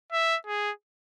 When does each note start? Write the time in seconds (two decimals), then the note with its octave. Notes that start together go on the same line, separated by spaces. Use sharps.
0.13 E5
0.47 G#4